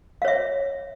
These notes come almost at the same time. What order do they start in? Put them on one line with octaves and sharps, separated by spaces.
F5 C#5 E5